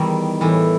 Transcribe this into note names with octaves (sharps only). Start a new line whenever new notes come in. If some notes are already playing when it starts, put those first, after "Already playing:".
Already playing: E2 D#3 G3
A2 E3